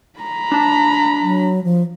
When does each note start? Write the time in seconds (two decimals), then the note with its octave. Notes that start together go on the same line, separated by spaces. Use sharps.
0.19 A#5 B5
0.52 D4 A5
1.22 F#3
1.64 F3